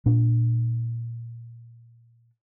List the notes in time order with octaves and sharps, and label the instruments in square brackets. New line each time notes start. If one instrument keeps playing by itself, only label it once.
[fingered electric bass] A#2 D4